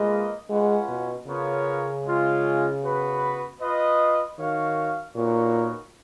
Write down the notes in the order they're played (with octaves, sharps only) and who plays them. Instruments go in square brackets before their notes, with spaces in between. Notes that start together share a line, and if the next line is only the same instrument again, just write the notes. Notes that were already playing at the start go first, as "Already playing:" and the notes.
Already playing: [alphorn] G#3 [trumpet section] A#3 F4 B4 D#5
[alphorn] G#3 [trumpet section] C#4 F4 B4 F#5
[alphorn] B2
[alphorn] C#3 [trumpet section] B3 F4 A#4 C#5
[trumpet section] G#3 C#4 F4
B3 F#4 B4
F4 B4 D#5
[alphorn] D#3 [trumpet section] F#4 C#5 F5
[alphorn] A#2 [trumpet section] B3 D#4 F#4 A#4 C#5